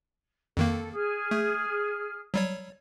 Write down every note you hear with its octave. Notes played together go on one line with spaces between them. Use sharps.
F2 D#3 A#3 A4
G#4 F6
A3
F#3 G3 C#5